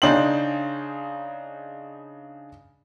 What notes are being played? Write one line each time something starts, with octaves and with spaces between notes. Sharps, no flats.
C#3 D4 D#4 G5 C6 F#7